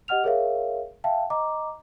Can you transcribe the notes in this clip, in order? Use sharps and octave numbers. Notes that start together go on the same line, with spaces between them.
G4 D#5 F#5 F6 F7
G#4 A#4 C#5 E5 F5
E5 F5 G5 A5
D#5 A#5 D6